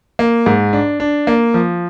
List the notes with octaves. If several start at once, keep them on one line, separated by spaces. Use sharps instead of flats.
A#3
G#2
D4
D4
A#3
F3